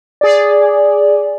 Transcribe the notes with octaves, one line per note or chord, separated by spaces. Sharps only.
G#4 D5